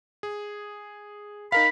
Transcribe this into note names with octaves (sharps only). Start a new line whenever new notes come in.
G#4
D#4 A#4 F5 B5